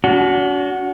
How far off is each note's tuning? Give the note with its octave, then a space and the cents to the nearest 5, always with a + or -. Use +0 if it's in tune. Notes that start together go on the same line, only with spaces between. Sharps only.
D4 -45 F#4 +0